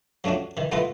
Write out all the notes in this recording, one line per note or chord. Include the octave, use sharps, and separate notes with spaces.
F3 A3 C#4 D4 F#4
D#3 E3
A3 B3 E4 F4 B4 D#5